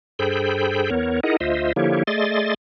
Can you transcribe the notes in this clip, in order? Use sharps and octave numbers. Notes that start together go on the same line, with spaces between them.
G2 G#4 A4 C5 G5 B5
E2 B3 A#4 C#5
D#4 E4 G#4 A#4 D#5 F#5
D2 F4 C5 D#5 E5
D3 F3 A#3 E4 G4 C#5
A3 G#4 D5 D#5 C6 A6